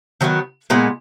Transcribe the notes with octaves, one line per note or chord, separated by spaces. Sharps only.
D#3 F#3 B3
A#2 G#3 B3